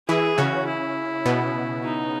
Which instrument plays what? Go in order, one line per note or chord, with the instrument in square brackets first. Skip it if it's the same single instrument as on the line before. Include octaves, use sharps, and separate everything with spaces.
[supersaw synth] E3 E4 [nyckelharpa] G#4
[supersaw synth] C#3 C#4 [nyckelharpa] F#4
[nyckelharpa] E4
[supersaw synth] B2 B3
[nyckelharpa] D#4